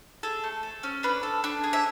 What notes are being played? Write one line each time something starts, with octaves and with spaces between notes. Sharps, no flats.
G#4 A4
A3
A4
C#4
D4 B4
A4
D4
G#4
E5